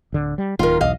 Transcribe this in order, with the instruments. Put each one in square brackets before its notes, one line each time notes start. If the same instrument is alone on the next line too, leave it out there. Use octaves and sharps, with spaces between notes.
[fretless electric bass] D1 D3
G3
[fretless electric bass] D1 D#3 [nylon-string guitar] F4 A#4
[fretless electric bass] B1 E2 [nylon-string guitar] D#5 F5